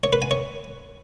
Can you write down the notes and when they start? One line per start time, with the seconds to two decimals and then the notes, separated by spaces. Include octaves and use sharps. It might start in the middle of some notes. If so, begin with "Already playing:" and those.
0.04 C#5
0.13 B4
0.22 G#5
0.31 C#5